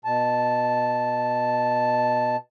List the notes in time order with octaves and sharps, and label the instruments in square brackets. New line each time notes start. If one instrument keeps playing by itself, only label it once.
[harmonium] B2 A5